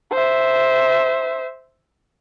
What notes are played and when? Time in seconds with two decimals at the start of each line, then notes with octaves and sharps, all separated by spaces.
0.12 C5 E5